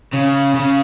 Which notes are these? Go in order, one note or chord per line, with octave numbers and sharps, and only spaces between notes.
C#3
C#3